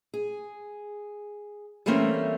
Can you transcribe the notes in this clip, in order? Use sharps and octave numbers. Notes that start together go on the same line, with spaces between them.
G#4
E3 G3 A3 A#3 C4 C#4